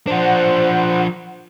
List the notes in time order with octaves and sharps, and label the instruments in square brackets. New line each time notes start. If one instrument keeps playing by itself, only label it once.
[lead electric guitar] F3 D4 [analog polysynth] C5 F#5